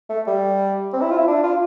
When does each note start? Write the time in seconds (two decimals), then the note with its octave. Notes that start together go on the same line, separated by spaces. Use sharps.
0.09 A3
0.27 G3
0.93 C4
1.01 E4
1.11 F4
1.18 E4
1.27 D4
1.43 F4